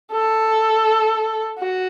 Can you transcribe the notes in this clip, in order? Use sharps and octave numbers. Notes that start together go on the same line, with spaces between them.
A4
F#4